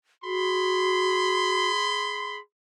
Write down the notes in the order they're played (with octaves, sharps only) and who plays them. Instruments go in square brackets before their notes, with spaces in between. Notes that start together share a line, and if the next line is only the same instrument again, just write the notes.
[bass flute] F#4 [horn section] G#4 B5 C6